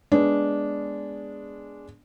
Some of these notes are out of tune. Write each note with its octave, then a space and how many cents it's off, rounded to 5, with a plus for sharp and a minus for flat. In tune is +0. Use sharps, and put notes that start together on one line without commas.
G#3 -5 B3 -5 D4 -10